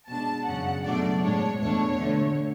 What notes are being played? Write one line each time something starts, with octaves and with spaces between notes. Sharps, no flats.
B2 G#3 D4 A5
F#2 C#3 F#3 F#5
B2 F#3 A3 D4 D5
A2 G#3 D4 C#5
E2 B2 A3 D4 C#5
D3 A3 D4